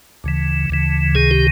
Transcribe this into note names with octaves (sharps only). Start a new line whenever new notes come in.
D2 C#3 E3
D2 C#3 E3
C#2 C3 D#3 G#4
G4